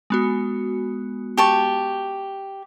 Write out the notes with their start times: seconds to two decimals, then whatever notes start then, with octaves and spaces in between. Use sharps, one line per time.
0.10 G#3 B3 F#4
1.37 G4 A5 C#6